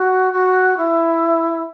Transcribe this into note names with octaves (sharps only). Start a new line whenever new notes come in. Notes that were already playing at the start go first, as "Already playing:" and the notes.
Already playing: F#4
F#4
E4